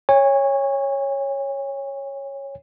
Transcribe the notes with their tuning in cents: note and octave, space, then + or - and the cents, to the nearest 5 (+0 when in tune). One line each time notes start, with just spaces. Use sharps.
C#5 -5 G#5 -40